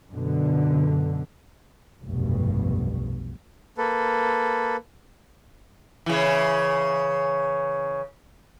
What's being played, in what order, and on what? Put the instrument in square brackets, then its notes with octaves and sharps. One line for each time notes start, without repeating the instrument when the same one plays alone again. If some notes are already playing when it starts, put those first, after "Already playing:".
[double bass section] F#2 B2 D3
F1 B1 G2 B2
[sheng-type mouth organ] A#3 A4 B4
[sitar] C#3 E3